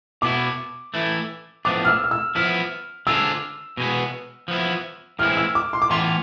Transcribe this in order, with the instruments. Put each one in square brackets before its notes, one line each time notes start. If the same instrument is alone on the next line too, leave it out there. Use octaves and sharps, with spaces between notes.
[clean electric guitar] B2 B3 E4 [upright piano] D6
[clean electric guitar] E3 A3 E4
[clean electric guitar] A2 F3 B3 D4 [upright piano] D6
[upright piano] F6
E6
F6
E6
[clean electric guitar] F3 B3 E4 [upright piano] F6
[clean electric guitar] D3 G#3 D4 F4 [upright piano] E6
[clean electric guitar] B2 G#3 B3
F3 B3 E4
[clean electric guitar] A2 E3 G#3 C4 E4 [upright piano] F6
[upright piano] E6
D6
C6
D6
[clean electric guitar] A2 E3 B3 F4 [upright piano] C6